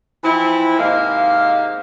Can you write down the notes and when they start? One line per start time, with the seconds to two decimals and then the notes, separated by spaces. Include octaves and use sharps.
0.23 E3 F3 C4 E4
0.79 G#2 C3 G#3 A#3 F5